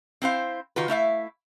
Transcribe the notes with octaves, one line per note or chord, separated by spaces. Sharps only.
C4 E4 C5 F5
D#3 F4 F#4 B4
A3 E4 E5 F5